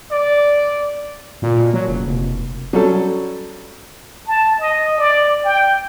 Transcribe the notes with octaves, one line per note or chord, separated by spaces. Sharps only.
D5
A#2
B2 A#3
F#3
F#1
F1
F#3 G3 C#4 A4
A5
D#5
D5
G5